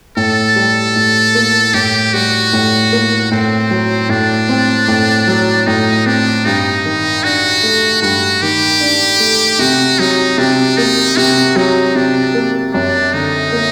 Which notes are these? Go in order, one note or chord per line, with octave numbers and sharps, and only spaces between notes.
A2 A4
G3
A2
A#3
A2 G4
G3 F#4
A2
A#3
A2 C4
F#3
A2 D4
C4
A2
F#3
A2 D#4
C4 D4
G2 D#4
D#3
D4 F#4
A3
G2 F#4
D#3 G4
D4
A3
C3 F#4
F#3 D#4
C3 D4
A#3 D#4
C3 F#4
F#3 D#4
C3 D4
A#3
F#2 D4
D3 D#4
A#3